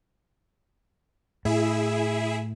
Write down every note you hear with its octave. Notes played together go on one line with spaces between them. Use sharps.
A2 E4 G#4 E5